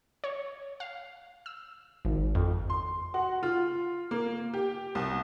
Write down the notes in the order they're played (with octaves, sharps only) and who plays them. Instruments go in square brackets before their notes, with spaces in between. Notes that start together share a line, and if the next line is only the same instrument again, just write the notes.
[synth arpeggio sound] C#5
F5
E6
G#1
F2
[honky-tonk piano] C6
F#4
F4
A#3
G4
C2